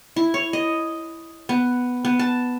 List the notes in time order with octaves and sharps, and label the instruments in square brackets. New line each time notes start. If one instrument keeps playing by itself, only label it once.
[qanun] E4
C#5
D#5
B3
B3
A5